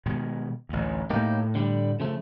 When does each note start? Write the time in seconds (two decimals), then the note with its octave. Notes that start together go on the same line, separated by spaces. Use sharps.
0.06 B2 D#3 G#3
0.69 A1 D2
1.10 A2 A3 A#3 D#4 G4
1.55 D3 G3
2.00 C#3 F3 A3